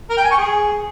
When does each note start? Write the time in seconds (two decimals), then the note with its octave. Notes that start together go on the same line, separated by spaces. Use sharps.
0.10 A#4
0.17 G5
0.24 G#5
0.31 C#6
0.38 G#4